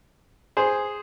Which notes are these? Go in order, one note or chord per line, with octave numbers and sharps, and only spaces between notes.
G#4 C5